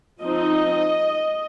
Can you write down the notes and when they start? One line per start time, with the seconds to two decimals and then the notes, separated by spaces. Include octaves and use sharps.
0.21 F3 C4 D#4 D#5